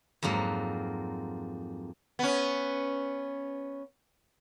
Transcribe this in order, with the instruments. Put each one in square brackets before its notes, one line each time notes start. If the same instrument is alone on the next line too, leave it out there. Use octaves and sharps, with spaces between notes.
[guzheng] F2 G#2 F#3 A#3 F#5
[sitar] B3 C#4